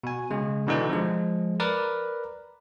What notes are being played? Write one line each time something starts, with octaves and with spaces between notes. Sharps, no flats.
B2 G#5
C#3 G#3
B2 D3 E3 D#4
F3 G#3
A#4 B4 D5